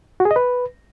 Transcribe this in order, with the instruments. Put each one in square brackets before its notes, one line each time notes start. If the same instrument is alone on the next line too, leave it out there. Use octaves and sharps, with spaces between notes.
[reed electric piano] F#4
G#4
D#5
B4